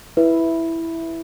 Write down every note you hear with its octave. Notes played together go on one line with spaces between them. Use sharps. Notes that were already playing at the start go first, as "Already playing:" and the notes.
E4 B4